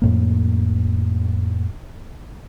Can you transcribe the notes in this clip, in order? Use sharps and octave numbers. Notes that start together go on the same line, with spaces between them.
F2 A2 A#3